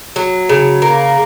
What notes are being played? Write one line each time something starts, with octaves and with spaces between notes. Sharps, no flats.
F#3
C#3
A#3